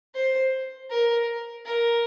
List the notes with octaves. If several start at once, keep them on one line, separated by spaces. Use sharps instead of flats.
C5
A#4
A#4